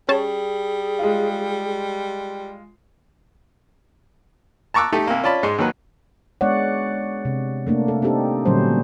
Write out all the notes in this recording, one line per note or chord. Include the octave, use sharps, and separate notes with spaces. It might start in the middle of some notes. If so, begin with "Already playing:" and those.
G3 C#4 G#4 C#5 A5
G#3 F4
A5 A#5 C#6 D6 E6 F#6
A3 D#4 G4 A4
C2 A#3
C#4 F4 D5 A5 B5
G#2 G#3 C6
D#2 D#3 F#3 B4
G#3 B3 D4 C#5 D5 F#5
C3
A3 A#3 D4
A4
C4 D4 D#4 G4 A4
A#2 D3 F#3 G3 C#4 C5